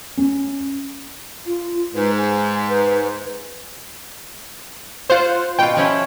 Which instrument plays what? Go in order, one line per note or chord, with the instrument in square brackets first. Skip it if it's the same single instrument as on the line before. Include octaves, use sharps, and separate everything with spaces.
[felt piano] C#4
[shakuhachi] F4
[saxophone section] G#2 [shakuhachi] B4
[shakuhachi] G#5
B4
[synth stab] F4 C5 [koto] F5 F#5
[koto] B2 F4 [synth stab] G5
[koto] F3 C#4 E4